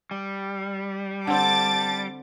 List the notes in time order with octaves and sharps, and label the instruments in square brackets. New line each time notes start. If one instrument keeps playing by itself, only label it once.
[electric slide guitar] G3
[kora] D3 C4 [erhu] A5 [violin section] D6 A6